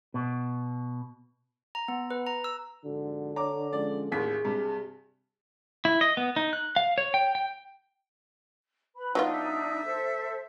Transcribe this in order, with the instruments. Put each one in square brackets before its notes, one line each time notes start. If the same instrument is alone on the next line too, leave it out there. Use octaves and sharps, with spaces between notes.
[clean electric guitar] B2
[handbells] A#5
B3
B4
A#5
E6
[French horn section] F2 G#2 F#4 [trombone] D3
[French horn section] C#5 [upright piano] A#5 D6
[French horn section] F3 G#3 C#4 [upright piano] D5
[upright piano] A1 D#2 B6 [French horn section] G#4
[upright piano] G2 C3
[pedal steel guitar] E4
D#5
B3
D#4
F#6
F5
C#5
G5
G5
[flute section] B4 B5
[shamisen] F#3 B3 F4 [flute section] D4 D#4
[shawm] E5
[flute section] A4 C5